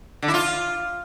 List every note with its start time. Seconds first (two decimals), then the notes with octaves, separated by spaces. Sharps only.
0.22 D3
0.28 E4
0.34 F4